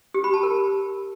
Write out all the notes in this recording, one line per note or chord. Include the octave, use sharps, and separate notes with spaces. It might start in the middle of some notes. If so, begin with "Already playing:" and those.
G4
B5
A5
A#4